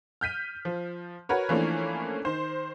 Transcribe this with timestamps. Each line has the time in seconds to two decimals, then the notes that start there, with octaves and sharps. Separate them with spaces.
0.21 F6 G6 B6 D#7
0.65 F3
1.29 F#4 A#4 B4 C#5
1.49 E3 F3 A3 A#3 C#4 D4
2.25 D#3 C5